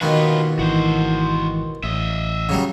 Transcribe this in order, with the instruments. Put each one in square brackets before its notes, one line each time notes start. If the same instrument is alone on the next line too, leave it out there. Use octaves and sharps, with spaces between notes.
[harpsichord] D#2 B2 D#3 [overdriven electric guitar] F4 B4
[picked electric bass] G#1 E3 [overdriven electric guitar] F#4 C5
[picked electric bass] A1 [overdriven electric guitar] D#5 E5
[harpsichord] C#3 F#3 G3